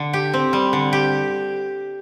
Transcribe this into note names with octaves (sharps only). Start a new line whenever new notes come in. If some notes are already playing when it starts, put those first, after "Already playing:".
Already playing: D3
G4
C4
G3
D3
G4